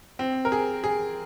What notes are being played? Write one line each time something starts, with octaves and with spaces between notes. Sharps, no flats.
C4
A#4
G#4
G#4